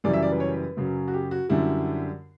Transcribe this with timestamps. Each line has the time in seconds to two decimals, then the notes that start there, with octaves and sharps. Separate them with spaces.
0.04 F#2 C#3 E3 G3 D5
0.13 E5
0.23 D5
0.31 B4
0.40 C#5
0.48 B4
0.77 F#2 C#3 F#3
1.08 F#4
1.13 G4
1.31 F#4
1.49 F#2 D3 G3 E4